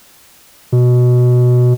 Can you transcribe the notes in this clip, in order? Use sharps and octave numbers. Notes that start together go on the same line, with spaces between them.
B2